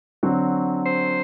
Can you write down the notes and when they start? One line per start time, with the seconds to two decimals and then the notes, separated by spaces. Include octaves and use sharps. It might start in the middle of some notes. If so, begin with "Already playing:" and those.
0.23 D3 F#3 C4 F#4
0.86 C5